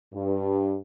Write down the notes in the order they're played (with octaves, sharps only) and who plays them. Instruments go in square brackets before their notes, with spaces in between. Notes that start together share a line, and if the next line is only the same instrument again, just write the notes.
[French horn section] G2